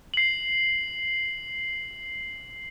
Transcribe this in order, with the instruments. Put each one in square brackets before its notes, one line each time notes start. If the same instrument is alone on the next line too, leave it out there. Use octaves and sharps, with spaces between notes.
[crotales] C7 F#7